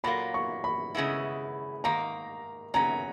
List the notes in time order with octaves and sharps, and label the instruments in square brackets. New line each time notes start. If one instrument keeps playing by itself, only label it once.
[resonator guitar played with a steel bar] A#2 F#3 A#3 [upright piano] B5
[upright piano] C#6
B5
[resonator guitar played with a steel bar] C#3 G#3 B3 E4
[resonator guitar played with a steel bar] G#2 D#3 A#3 [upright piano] A#5
[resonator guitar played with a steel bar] C#3 F#3 C#4 [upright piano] A#5